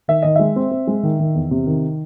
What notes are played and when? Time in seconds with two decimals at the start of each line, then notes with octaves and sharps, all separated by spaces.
0.08 D#3 E5
0.22 D#3 D#5
0.36 G#3 E5
0.56 C4
0.71 C4
0.87 G#3
1.03 D#3
1.19 D#3
1.35 E2
1.51 C3
1.66 D#3